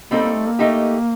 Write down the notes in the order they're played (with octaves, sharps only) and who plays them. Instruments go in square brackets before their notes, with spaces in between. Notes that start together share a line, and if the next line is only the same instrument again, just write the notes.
[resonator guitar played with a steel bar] G3 C4 D#4 A4 [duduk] A#3
[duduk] A#3
A3
A#3
[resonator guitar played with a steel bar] A3 D#4 G4